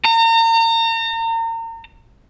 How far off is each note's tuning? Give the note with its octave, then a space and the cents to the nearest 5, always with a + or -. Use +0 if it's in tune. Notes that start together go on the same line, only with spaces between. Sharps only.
A#5 -35